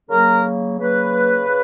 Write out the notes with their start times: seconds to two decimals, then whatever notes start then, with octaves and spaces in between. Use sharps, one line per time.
0.09 C#3 F#3 A#3 A#4
0.78 C#3 F#3 A#3 B4
1.48 C#3